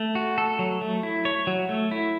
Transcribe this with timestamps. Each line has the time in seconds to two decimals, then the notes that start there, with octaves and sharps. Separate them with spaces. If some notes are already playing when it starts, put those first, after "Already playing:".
Already playing: A3
0.15 F#4
0.38 A4
0.59 F#3
0.81 A3
1.03 E4
1.25 C#5
1.47 F#3
1.69 A3
1.91 E4